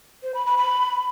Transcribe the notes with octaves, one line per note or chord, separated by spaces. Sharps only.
C5
B5
B5
B5